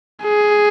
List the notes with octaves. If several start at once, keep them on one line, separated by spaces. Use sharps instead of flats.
G#4